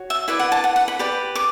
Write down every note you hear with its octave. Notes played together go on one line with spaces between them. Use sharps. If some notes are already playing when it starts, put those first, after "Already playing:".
Already playing: F#4 C#5
E5
E4 B4 D5 E5
F#5
A5
F#5
F#5
B5
G4 B4 D5 B5
D6